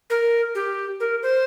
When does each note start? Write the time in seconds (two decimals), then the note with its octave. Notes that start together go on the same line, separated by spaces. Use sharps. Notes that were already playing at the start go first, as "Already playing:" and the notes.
0.10 A#4
0.55 G4
1.00 A#4
1.23 C5